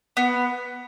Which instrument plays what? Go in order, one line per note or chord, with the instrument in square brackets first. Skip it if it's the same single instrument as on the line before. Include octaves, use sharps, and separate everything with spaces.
[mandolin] B3